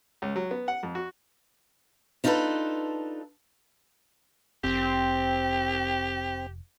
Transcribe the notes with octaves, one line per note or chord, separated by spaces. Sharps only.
C#2
F#3
B3
F#5
F2
F#4
D4 D#4 F4 F#4 A4 B4
F1 C4 G4